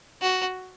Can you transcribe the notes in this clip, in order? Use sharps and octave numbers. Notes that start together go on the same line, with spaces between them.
F#4